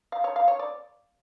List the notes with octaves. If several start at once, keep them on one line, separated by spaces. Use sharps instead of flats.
F5
C#5
F5
C#5
D5